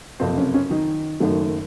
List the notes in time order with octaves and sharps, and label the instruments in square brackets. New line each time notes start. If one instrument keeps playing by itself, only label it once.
[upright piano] F#1 F2 C3 C4
C#4
C#4
D#3 D#4
F#1 F#2 D#3 A3